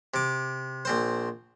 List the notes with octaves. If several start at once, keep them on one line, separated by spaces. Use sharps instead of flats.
C3 D6
A#1 C4 C5